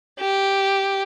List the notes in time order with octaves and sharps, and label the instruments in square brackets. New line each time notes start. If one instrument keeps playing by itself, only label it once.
[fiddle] G4